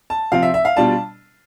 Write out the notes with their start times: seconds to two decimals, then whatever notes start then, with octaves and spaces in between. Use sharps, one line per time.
0.10 A5
0.32 C3 F3 C4 F5
0.43 E5
0.54 E5
0.65 F5
0.77 B2 G3 D4 F4 A5